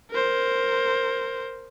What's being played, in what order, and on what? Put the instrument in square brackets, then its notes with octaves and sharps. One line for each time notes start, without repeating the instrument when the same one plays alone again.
[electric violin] A#4 C5